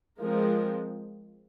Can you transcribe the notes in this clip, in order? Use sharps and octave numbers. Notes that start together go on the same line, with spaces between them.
F3 G#3 C4 A#4